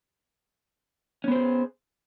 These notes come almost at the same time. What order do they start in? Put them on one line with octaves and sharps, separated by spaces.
C#4 B3 C5 G4 G#4